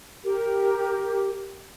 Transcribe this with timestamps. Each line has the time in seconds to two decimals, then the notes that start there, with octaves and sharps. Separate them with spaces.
0.25 G4 A#4